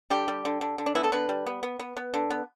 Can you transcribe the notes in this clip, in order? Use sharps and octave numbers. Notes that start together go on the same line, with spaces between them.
D3 G3 G4
G3
D3
D3
D3
D4
E3 B3 E4
A3 A4
D3 B3 B4
G3
B3
B3
B3
B3
D3
B3